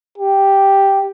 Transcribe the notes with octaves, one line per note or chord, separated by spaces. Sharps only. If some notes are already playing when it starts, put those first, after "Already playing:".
G4